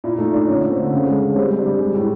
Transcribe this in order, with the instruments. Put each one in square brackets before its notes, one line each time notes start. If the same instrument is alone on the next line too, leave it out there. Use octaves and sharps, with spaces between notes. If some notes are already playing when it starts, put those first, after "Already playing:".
[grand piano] A#2 E4
A3 D#4
A#2 D4
D3 C#4
A3
C4
D3
C#3
G#3
C#3
C#4
G3 C4
G3
D4
G3
G#3
A2